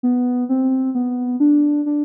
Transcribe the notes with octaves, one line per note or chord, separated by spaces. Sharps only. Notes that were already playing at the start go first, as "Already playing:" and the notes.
B3
C4
B3
D4
D4